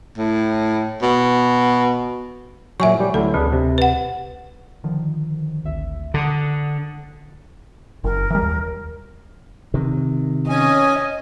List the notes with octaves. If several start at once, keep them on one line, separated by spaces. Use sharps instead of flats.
A2
B2
A#2 F#3 E5 G#5 C#6
G3 G4
D2 F#3 E4 A4
D2 D4 G#4 B4
C3
B4 F#5
D3 D#3 F3
G#1 D2 E5
D3 F#5 D#6
F#1 A#4
E3 G3
D#2
C3 D#3
C#4 D#5 G#5